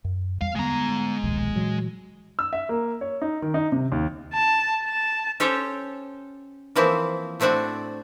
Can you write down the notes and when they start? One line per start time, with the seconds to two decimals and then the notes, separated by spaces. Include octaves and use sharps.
0.05 F#2
0.41 E2 G3 F5
0.56 D3 G3 G#3 B3 A#5
1.24 D1 A#1 D#2
1.56 A#2 E3 F#3
2.39 E6
2.53 E5
2.69 A#3
3.01 C#5
3.22 D#4
3.42 D#3
3.54 D#4
3.72 C3
3.92 D#2
4.34 A5
4.84 A5
5.40 C#4 G4 A4 C5 C#5
6.76 E3 F3 A#3 C4 E4
7.40 A2 A3 C4 D4 F#4